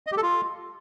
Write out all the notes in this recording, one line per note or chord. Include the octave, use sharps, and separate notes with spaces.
D#5
G4
A4
F4